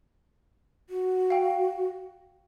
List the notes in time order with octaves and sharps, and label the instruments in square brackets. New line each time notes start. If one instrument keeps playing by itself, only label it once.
[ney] F#4
[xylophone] F5 G5